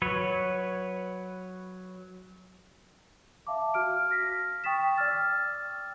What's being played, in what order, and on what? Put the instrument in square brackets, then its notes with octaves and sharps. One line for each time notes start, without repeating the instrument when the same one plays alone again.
[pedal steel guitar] F#3 B4 C#5
[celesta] E5 F5 A5 D6
F#4 F6 D7
F6 A#6 B6
G5 C#6 D#6 A6 B6 E7
D5 G5 D6 E6 F6 A6